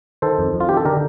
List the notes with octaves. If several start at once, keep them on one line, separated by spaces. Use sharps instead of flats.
D#3 A4 C5
F2
F2
F4
D#3 G4
A4
D3 G4 A#4